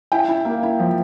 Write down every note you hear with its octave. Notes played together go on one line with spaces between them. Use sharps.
E4 G5
E4
A#3
E4
F3